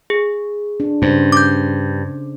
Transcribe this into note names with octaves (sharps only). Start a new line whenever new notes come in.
G#4
D4
G2 C#3 C5
D6 G6